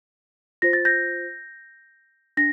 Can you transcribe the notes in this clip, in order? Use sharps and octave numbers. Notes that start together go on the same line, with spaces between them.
F4 C5 A#6
A6
G6 A#6
D4 A#6